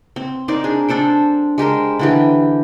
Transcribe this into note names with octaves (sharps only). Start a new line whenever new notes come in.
C4
D#4 A#4 C5 D5
D4 G#4
D4 A4 C5 G5
G#3 G4 A#4 C5
D3 E3 G4